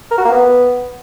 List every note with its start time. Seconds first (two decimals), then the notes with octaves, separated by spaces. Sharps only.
0.11 A#4
0.18 F#4
0.25 A#3
0.32 B3